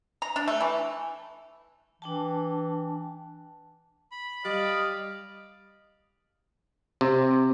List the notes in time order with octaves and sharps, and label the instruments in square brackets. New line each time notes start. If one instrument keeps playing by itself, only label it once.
[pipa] A#5
D4
A3
E3
[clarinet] E3 [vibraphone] D4 G5 A5
[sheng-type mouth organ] B5
[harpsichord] G3 [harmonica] D5 F5 [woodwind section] D#5 D#6
[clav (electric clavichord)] C3